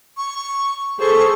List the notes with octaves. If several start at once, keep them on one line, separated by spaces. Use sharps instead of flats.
C#6
G#4 A4 C5 C#6